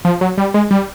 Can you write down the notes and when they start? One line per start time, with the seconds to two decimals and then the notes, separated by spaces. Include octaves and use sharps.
0.05 F3
0.21 F#3
0.38 G3
0.54 G#3
0.71 G3